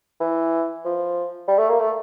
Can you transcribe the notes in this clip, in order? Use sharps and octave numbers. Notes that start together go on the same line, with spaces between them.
E3
F3
G3
A3
A#3
A3